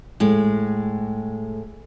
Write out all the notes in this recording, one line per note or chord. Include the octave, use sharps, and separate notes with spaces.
A2 G#3